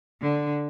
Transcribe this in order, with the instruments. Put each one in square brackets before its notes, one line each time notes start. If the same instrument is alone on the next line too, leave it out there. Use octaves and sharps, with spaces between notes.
[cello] D3